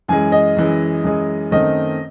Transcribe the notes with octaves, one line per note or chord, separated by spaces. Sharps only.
F#2 E3 G#3 G#5
D#5
F#2 E3 G#3
F#2 E3 G#3
F#2 D#3 A3 C4 D#5